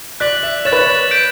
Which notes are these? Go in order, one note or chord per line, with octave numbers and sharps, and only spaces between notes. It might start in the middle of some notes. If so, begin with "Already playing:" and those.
D5 F#6 B6 F#7
E5
C#5 F#6 A6 E7
B4
C#5
G6 B6 D7